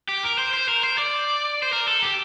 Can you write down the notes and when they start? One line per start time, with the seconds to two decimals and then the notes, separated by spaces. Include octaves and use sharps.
0.09 G4
0.24 A#4
0.39 C5
0.53 C5
0.68 A#4
0.84 C5
0.98 D5
1.62 C5
1.73 A#4
1.88 A4
2.02 G4